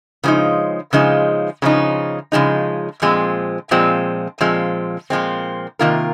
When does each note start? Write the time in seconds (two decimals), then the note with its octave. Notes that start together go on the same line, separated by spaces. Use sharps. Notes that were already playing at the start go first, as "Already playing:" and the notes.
0.24 C#3 F3 G#3 D#4
0.93 C#3 F3 G#3 D#4
1.62 C#3 F3 G#3 D#4
2.32 C#3 F3 G#3 D#4
3.02 A#2 F3 G#3 C4
3.71 A#2 F3 G#3 C4
4.41 A#2 F3 G#3 C4
5.10 A#2 F3 G#3 C4
5.79 C3 D#3 A#3 F4 A#4